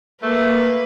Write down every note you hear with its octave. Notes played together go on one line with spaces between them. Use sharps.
A3 A#3 B4